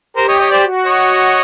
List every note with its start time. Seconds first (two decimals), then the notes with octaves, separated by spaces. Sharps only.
0.16 G4 A#4 C5
0.28 C#5 D#5
0.39 C#5 D#5
0.51 C5 D5
0.63 F#4
0.85 C#5 D#5